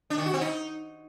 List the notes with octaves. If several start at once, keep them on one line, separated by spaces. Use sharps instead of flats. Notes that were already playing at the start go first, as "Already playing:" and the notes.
D4
D#3
F#4
C4
D#4